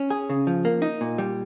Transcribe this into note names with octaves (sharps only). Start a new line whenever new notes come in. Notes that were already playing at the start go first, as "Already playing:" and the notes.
Already playing: C#4
G#4
C#3
F3
A#3
D#4
A#2
G3